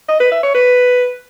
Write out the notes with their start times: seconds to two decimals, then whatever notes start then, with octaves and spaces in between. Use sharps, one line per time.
0.08 D#5
0.20 B4
0.31 E5
0.43 C#5
0.55 B4